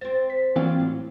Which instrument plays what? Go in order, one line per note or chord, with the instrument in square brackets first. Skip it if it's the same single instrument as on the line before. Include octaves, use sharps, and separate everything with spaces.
[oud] C4 C5 [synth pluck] A6
[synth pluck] B6
[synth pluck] E3 A#3 C4 [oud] F#3 F4 D5
[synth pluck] A2